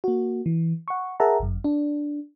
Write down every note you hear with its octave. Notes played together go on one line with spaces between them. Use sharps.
A#3 F#4
E3
F#5 C#6
G#4 A#4 E5 F#5 A5 A#5
G1 F#2
D4